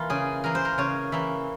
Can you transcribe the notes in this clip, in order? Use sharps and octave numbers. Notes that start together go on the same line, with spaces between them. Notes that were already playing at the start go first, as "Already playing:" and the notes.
Already playing: E3 A#3 F4
C#3 G#4
E3 A#3 A#4
C5
A#4
C#3 C#5
E3 A#3 E5